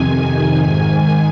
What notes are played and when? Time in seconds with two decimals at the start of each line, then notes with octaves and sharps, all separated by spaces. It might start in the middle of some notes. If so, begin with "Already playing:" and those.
Already playing: F2 C3 D#3 G#5
0.14 G#5
0.61 G#2 D#3